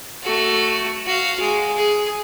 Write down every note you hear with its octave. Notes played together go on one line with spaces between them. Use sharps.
A3 F#4
F#4 F5
G#3
G#4